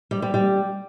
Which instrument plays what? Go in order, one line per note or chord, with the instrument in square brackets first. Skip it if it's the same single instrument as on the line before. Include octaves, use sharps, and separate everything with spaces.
[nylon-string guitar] G3
G3
G3